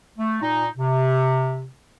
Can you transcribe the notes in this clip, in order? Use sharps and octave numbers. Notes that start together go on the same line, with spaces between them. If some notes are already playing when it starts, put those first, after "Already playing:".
A3
A#2 D#4
C3